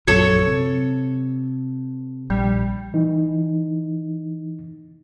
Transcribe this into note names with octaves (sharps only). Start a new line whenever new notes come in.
A#1 F#2 F#3 A4 C#5
C3
A#1 G3
E3 D#4